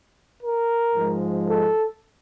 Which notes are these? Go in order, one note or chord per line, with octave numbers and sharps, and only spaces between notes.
A#4
G#2 F3 G#3
A4